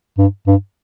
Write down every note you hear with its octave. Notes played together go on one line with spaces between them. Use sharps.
G2
G2